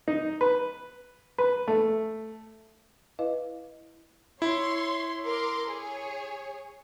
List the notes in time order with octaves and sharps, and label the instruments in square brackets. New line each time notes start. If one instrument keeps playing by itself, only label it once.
[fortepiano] D#4
B4
B4
A3
[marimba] E4 B4 D#5 F5
[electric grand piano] E4 [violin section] C#5 C6
[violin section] A#4 C6 D6
G#4 C#5